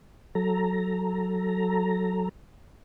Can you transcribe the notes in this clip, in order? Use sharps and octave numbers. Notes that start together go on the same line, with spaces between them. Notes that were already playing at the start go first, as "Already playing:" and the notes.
F#3 A4 A#5